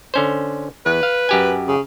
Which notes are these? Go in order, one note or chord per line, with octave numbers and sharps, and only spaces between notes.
D3 C#4 C5
E2 B4
F5
F#2 G4 G#5
C#3